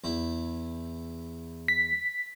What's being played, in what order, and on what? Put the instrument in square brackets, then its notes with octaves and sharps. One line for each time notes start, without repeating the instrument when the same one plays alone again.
[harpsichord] E2 E4
[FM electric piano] B6